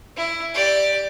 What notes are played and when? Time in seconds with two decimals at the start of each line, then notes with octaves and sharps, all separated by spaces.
0.17 E4
0.54 G4 D5